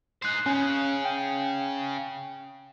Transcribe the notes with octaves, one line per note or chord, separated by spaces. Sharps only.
D#4 C5 F#6 C7
C#3 C#4
G5